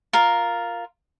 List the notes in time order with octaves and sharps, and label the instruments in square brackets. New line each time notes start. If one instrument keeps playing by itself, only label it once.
[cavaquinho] F4 A#4